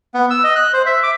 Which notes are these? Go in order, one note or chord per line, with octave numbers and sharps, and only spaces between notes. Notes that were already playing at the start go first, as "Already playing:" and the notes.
B3
E6
D#5
F#6
C5
E5
D6